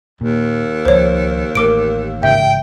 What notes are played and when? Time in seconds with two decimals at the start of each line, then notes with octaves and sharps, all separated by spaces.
0.21 D#2 A#2
0.85 C#2 F3 C5 C#5
1.55 A1 A3 A#4 D6 D7
2.23 A1 G#2 C#3 E5 G5